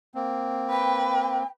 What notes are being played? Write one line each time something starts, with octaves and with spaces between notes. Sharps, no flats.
A#3 C4
B4 G5